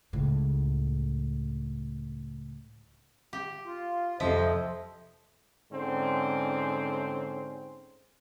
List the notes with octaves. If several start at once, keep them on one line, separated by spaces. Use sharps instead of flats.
C#2 A2
G4
F4
F2 C3 F3 C5 D#5 E5
G#2 D3 C4 C#4